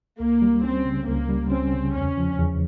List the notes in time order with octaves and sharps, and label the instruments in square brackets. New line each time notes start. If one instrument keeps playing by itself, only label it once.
[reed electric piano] C#2 [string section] A#3
[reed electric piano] G3
[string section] C4 [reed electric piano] C#4
[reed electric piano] C#3
[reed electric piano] C#2 [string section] A#3
[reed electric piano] G3
[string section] C4 [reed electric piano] C#4
[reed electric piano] C#3
[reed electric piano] E2 [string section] C#4
[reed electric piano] F3
E2